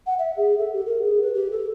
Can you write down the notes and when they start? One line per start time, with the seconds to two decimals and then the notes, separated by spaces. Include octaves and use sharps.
0.06 F#5
0.18 E5
0.37 G#4
0.58 A4
0.73 G4
0.86 A#4
1.02 G#4
1.21 B4
1.34 G4
1.51 A4